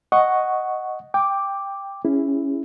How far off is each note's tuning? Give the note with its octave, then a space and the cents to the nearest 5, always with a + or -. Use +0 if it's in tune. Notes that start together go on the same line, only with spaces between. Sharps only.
D#5 +0 F#5 +0 C#6 +0
G5 +10 D6 +0
C#4 +0 E4 +0 G#4 -20